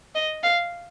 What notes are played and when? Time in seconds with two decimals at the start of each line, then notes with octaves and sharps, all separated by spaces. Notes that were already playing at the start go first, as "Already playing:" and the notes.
0.15 D#5
0.43 F5